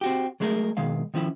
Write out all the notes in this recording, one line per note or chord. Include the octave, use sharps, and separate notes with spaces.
C4 F#4 G4
F#3 G#3 A3 G#4 A#4
B2 D#3 G#3 F5
D#3 F3 C#4 E4